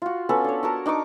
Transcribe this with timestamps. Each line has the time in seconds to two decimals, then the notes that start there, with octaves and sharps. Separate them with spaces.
0.02 F4 F#4
0.29 B3 C#4 A4 B4
0.44 D4 C#5
0.63 F#4 A#4 A5
0.86 D4 D#4 C#6 D6